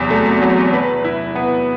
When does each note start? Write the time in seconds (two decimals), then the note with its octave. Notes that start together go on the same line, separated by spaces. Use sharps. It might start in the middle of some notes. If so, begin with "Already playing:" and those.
Already playing: E2 C3 F#3
0.11 A3
0.42 F#3
0.73 B4
1.04 E4
1.35 B3